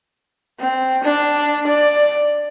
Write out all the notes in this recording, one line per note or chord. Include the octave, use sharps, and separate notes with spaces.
C4
D4
D5